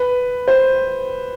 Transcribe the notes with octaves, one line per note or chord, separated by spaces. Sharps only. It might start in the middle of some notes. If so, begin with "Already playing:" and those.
Already playing: B4
C5